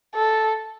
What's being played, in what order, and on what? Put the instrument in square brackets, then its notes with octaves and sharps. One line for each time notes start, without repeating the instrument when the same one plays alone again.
[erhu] A4